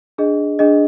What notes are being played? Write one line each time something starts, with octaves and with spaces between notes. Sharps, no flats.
D4 G#4 D#5
D4 G#4 D#5